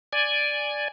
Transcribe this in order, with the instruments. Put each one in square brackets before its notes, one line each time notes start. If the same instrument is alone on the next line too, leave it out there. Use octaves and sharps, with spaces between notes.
[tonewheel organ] D5 G#5